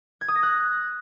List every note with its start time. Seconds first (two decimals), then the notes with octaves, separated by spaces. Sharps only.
0.21 G#6
0.28 D#6
0.36 A#6
0.43 F#6